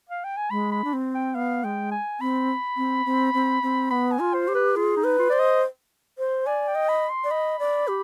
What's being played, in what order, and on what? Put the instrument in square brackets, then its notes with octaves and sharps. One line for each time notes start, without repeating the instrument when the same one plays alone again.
[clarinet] F5
G5
G#5
[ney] G#3 [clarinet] B5
[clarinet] B5
[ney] D4
C4
[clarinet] G5
[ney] B3 [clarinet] F5
[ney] G#3 [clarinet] G5
[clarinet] G#5
[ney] C4 [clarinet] B5
[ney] C4
C4
C4
C4
[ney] B3 [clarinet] B5
[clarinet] G#5
[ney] F4
[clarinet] C5
[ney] G4
[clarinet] B4
[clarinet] F4 [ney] G#4
[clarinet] D#4
[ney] B4
[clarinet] F4
[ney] C5 [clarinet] D5
[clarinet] D#5
[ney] C5
[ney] D5 [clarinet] G#5
[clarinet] G5
[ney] D#5
[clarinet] B5
C6
[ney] D5
[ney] D#5 [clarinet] B5
[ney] D5
G4